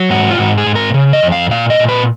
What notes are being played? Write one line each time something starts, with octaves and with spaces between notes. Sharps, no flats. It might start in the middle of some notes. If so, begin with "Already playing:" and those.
Already playing: F#3
G#2 F#4
F4
G#2 F#4
G#4
G#2
A#4
C#3
D#5
F2
F5
A#2 F5
D#5
A#2
B4